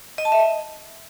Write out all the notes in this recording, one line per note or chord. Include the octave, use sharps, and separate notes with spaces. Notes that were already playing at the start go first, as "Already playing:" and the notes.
D#5
A5
E5
D#5